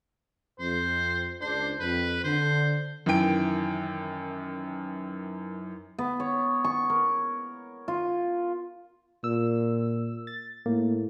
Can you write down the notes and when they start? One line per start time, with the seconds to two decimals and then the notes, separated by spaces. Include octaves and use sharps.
0.60 F2 C5
1.41 C#2 D4 C5
1.80 F2 B4
2.24 D3 C5
3.06 F#2 D#3 E3 G5 D7
5.98 B3
6.20 C#5
6.64 C#6
6.90 A#4
7.88 F4
9.24 A#2 E6
10.27 A6
10.66 A2 A#3